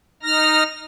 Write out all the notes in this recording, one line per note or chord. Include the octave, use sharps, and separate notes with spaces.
D#4 F6 A#6